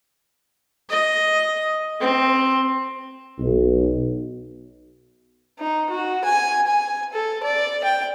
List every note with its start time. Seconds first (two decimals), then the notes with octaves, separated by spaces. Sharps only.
0.89 D#5
2.00 C4
3.39 B1
5.59 D#4
5.90 F#4
6.24 G#5
6.67 G#5
7.13 A4
7.43 D5
7.84 G5